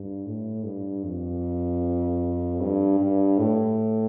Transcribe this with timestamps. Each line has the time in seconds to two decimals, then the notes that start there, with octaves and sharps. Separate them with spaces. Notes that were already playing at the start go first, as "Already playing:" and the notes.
Already playing: G2
0.26 A2
0.65 G2
1.04 F2
2.61 G2
3.00 G2
3.38 A2